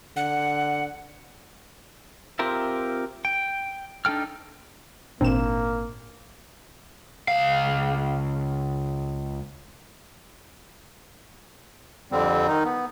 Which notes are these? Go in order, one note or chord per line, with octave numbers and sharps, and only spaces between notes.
D3 F#5
C4 F4 G4 A#4 E5
G5
D4 D#4 A4 G5 F6
G#1 A#2 A#3 C4 D4 E7
C#2 F5
F2 D3 G3 C4
D#3 D#4
B3